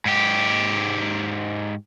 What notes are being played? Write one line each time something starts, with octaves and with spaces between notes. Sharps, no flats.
G#2 G4